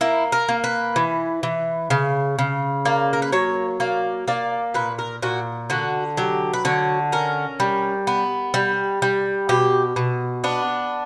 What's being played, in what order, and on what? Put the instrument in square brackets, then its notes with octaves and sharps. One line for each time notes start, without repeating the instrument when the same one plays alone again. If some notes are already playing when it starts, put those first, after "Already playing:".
[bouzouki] A#3 E4
A#4
A#3
B4
E3
E3
C#3
C#3
A#3 D5
A#4
B4
F#3 C#5
A#3 D5
A#3 D5
A#2 B4
A#4
A#2 F#4
D3 F#4
F#3 G4
B4
D3 C#5
C#4 A#4
G3
B3
G3
G3
B2 G4
B2
B3 D4